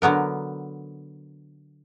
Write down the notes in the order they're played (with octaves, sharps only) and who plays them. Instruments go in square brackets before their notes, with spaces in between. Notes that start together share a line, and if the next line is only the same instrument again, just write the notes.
[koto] D3 F#3 B3 A#4